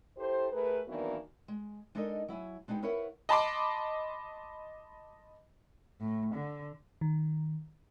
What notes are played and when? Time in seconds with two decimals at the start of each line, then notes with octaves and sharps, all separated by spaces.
0.17 E4 G4 A4 C5
0.52 A3 G#4 A#4 B4
0.87 D#3 E3 F#3 A#3 B3 D4
1.48 G#3
1.95 G#3 D4 D#4 A4 A#4 D#5
2.28 F#3 E4 E5 G#5
2.68 G#3 D4 D#4 G4 B4 F#5
2.82 E4 A#4 B4 C#5 E5 F#5
3.29 D#5 A5 B5 C6 D6
6.01 A2
6.34 D3
7.01 D#3